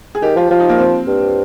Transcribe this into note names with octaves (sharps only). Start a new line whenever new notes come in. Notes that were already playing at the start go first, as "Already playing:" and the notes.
G#4
D#3 G4
F3 F4
F3 F4
D#4
A#3
C4
G2